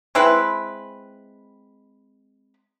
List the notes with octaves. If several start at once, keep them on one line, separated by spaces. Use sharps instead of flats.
G#3 C4 E4 B4